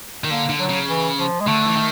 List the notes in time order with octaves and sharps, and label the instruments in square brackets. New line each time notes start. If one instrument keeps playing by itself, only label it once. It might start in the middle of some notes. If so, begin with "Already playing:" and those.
[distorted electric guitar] D#3
[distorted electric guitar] D3 [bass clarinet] A#3
[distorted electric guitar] D3
[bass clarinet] F#3
[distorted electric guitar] C#3
[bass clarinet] E3
F3
G#3
[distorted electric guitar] D3 [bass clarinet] A3
[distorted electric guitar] E3
D#3